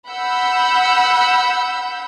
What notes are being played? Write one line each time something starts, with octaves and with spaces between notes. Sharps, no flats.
F#5 B5 E6 G6